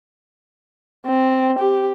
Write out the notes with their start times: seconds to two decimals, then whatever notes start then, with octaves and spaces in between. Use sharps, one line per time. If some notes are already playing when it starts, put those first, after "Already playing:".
1.06 C4
1.59 G4